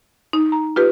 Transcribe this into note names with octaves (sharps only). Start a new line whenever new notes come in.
D#4
A#5
F4 G4 B4